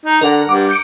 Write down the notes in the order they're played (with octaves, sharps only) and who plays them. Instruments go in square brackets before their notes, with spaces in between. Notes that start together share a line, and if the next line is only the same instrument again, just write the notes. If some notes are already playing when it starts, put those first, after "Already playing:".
[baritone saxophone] D#4
[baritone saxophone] D3 [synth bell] A#4 F#5
[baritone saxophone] G2 [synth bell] D6
[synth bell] G6 C#7 D7